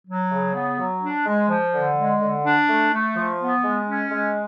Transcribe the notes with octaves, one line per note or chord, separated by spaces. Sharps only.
F#3
C#3
B3
F#3
D4
G#3
F3
D3
G#3
D3
D4
A3
A3
F3
B3
G#3
C#4
G#3